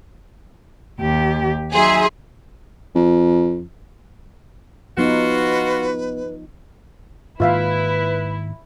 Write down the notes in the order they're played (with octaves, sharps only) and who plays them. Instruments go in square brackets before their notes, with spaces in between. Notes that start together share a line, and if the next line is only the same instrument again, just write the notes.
[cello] D#2 G4
[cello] F#3 [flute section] D#4 E5 C6 [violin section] G#4
[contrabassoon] F2
[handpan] F3 D#4 [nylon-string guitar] B3 [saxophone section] F4 F#4 [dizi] B4
[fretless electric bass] G#2 D#3 A#3 [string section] E4 [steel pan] F4 E5 F5 [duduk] B4